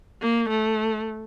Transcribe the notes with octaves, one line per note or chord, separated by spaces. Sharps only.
A#3
A3